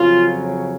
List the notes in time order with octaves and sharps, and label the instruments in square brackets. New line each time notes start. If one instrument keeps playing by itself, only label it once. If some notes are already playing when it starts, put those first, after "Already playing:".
Already playing: [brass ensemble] F2 C#3 F#3 F4